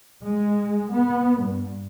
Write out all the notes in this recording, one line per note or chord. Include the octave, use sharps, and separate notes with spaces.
G#3
B3
G2